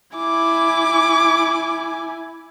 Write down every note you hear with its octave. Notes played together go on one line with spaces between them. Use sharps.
E4 G#5 D6